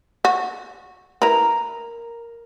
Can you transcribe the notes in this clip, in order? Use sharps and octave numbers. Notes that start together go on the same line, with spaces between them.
F#4
E4 A#4 B4 A#5